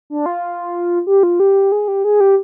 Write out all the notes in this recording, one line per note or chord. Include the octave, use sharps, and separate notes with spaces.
D4
F4
G4
F4
G4
G#4
G4
G#4
G4